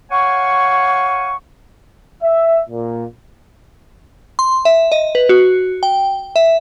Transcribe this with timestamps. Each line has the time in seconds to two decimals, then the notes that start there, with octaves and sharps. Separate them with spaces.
0.11 C#5 F5 F#5 G#5 C#6
2.23 E5
2.70 A#2
4.39 C6
4.65 E5
4.92 D#5
5.15 B4
5.29 F#4
5.83 G5
6.36 E5